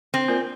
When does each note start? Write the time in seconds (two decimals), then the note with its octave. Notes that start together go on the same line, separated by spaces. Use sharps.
0.14 C4
0.28 A#3 F4 A#4 D5